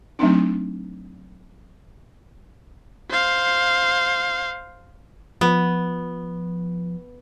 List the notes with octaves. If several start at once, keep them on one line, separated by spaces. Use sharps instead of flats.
F#3 A3 C4 D4 D#4
C5 F5
F3 B3